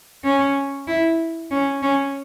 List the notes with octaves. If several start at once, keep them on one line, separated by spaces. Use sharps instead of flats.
C#4
E4
C#4
C#4